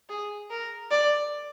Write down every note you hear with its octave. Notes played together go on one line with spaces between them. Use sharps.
G#4
A#4
D5